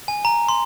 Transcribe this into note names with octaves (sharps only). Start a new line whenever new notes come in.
G#5
A#5
C6